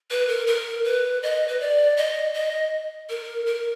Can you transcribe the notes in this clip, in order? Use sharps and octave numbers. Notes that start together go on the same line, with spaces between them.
B4
A#4
A#4
B4
D#5
B4
D5
D#5
D#5
A#4
A#4